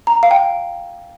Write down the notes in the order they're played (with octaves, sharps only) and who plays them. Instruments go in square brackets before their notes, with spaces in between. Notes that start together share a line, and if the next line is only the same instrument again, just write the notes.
[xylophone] A#5
F5
G5